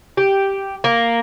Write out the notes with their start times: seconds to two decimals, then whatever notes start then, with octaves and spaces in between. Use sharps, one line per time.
0.17 G4
0.84 A#3